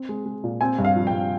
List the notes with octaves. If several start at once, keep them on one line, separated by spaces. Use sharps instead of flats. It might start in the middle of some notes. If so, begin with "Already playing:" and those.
Already playing: C4
G#3
G#3
A#2
C4 G#5
G2
F5
F3
G5
G2